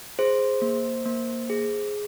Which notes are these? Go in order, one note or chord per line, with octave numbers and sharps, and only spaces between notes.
G#4 C5
A#3
A#3
G#4